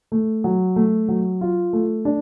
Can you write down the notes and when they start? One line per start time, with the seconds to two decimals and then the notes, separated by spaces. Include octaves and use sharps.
0.12 A3
0.44 F#3
0.76 A3
1.08 F#3
1.41 F4
1.73 A3
2.05 D4